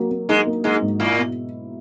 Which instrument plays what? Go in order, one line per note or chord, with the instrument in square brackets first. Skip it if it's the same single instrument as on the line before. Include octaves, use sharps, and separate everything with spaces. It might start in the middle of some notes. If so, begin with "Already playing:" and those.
Already playing: [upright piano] F#3 A#3
A#3
[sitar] G#2 G#3 [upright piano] D#4
[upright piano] A#3
[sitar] G#2 G#3 [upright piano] D#4
[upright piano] G#2
[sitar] A#2 A#3 [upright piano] E4
[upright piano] B2